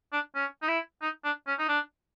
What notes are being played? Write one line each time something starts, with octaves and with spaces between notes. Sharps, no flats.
D4
C#4
D#4
E4
D#4
D4
C#4
D#4
D4